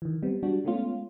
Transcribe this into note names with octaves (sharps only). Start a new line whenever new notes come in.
D#3 E3
G3 B3 C4
G3 D4 F#4
G#3 A3 B3 C#4 F4